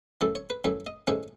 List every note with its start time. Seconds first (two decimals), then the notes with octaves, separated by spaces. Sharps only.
0.21 F#2 E3 A3 A4
0.35 C#5
0.50 B4
0.64 F#2 E3 A3 C#5
0.87 D#5
1.07 G#2 E3 A3 C#4 C#5